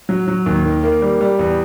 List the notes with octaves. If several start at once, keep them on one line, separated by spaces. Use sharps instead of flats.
F#3
F#3
D#2
D#3
A#3
G3
G3
E2